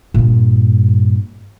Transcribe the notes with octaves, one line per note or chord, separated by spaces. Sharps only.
G2 A#2